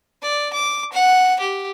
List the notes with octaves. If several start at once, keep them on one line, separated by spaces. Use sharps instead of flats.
D5
D6
F#5
G4